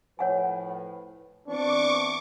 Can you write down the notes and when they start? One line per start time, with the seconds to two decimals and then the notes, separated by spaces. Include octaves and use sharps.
0.19 A2 F3 B4 C#5 F#5 G#5
1.48 E3 B3 C4 D4 C#6 D6